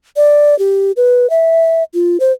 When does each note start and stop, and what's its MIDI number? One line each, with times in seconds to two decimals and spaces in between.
0.16 0.57 74
0.59 0.92 67
0.97 1.29 71
1.30 1.83 76
1.94 2.17 65
2.20 2.32 72